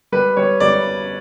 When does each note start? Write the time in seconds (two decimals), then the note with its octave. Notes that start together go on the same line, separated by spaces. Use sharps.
0.12 G3 B4
0.37 G3 C#5
0.60 G3 D5